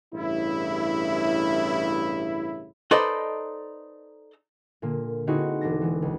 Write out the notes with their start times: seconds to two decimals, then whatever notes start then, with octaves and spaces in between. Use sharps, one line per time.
0.14 A1 G2 C#3 E4
2.91 D#4 A4 B4 C5 D5 D#5
4.82 A#2 D3 A#3
5.27 D3 C4 D#4 E4 F#4 G#4
5.61 E1 D4 A#6
5.82 E3 G#3
6.02 C#2